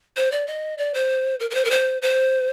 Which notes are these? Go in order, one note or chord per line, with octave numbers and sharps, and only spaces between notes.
C5
D5
D#5
D5
C5
A#4
A#4
C5
A#4
C5
C5